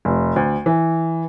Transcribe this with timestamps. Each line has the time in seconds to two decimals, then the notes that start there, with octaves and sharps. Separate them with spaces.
0.05 F1
0.36 D2
0.66 E3